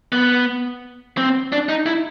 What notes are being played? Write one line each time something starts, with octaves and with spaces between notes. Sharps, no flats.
B3
C4
D4
D#4
E4